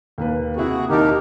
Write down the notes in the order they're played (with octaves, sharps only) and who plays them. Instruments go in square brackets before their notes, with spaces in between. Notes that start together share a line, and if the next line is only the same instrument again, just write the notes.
[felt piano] D#2 A#3 B4
[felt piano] C3 E4 [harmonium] F#4 G#4
[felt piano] D#2 D#5 A5 [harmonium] D#4 G4 A#4